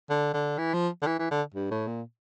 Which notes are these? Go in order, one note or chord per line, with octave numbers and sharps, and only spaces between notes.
D3
D3
E3
F3
D3
E3
E3
D3
G2
A2
A#2